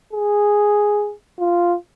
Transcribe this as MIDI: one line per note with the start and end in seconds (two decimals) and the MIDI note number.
0.13 1.13 68
1.39 1.75 65